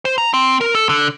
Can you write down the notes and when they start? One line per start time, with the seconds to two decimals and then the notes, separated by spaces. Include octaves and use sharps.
0.05 C5
0.18 A#5
0.34 C4
0.61 A#4
0.75 A4
0.89 D3